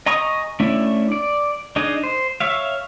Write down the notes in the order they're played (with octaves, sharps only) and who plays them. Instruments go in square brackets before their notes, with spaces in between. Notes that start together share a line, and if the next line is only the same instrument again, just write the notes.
[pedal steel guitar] D#5 G#5 A#5 C#6 D#6
A3 C#4 D4 E4 E5
D5
D4 D#4 G#4 D#5
C5
C#5 E5 F5